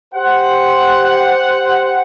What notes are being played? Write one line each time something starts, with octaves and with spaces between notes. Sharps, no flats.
G4 C5 F#5